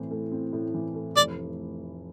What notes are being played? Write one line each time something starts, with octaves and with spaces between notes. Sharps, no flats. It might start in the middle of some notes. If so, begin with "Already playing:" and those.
Already playing: A2 E3 C4
A3
C4
A2
E3
A3
F1 D5